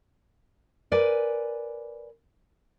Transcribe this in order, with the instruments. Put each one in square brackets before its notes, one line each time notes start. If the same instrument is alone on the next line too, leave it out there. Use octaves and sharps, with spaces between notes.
[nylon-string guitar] A#4 B4 D5 G#5